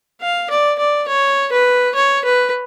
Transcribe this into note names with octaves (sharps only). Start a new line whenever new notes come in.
F5
D5
D5
C#5
B4
C#5
B4